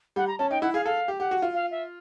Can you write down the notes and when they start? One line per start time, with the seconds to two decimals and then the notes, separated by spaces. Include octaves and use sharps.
0.16 G3 F#5
0.28 A#5
0.39 C#4 A5
0.51 D#4 G5
0.62 E4 F#5
0.74 G#4 F5
0.85 A4 F5
1.08 G4
1.19 G4 F#5
1.31 F#4
1.42 F4
1.54 F5
1.71 E5